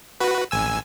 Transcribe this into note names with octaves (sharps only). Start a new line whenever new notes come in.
F#4 B4
A1 G#5 E6